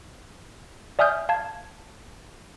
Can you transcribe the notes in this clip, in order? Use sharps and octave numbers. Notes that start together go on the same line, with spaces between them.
D5 E5 G#5 D#6 F6 G6
F5 A5 G#6